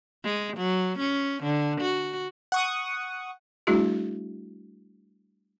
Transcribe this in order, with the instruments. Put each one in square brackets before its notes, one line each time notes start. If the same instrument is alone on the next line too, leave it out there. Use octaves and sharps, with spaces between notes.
[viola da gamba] G#3
F#3
C#4
D3
F#4
[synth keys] F#5 C#6 D#6
[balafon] G3 A3 D4 E4 F#4 G#4